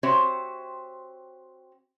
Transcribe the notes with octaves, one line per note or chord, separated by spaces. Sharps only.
C4 F#4 G4 C5 C#5 E5